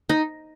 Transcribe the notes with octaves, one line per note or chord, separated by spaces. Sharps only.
D#4